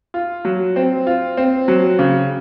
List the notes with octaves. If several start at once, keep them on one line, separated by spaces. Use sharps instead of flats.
F4
F#3
C4
F4
C4
F#3
C#3